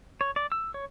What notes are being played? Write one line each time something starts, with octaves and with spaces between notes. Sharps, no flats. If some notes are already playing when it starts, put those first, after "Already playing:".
C#5
D5
E6
C#5